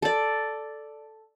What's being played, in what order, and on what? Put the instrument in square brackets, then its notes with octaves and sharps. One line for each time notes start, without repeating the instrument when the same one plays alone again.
[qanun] A4 D5